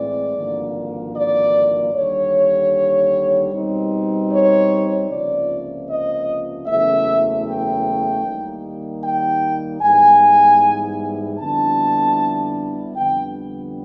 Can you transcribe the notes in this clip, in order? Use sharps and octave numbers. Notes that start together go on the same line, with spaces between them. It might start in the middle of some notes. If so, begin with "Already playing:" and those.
Already playing: A2 E3 G#3 C4 D5
G#1 G2 D3 F3 A#3
D5
D#2 D3 G3 C#5
B2 G3 C4 D#4
C#5
C#2 C3 F3 A#3 D5
D#5
F#1 E2 C#3 E3 A3 E5
G5
D#2 D#3 G3 A#3 D#4
G5
G#2 E3 G3 B3 E4 G#5
F2 D3 G3 B3 E4 A5
F2 D3 G3 B3 G5